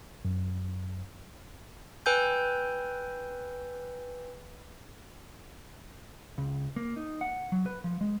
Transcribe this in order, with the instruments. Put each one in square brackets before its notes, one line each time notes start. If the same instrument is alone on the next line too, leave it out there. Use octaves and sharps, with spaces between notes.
[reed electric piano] F#2
[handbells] B4 G5 G#5 E6 G6
[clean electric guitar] C#2
A#3
D#4
F#5
F#3
B4
F3
G#3